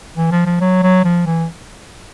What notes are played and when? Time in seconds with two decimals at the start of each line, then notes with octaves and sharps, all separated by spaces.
0.17 E3
0.31 F3
0.46 F3
0.61 F#3
0.83 F#3
1.04 F3
1.26 E3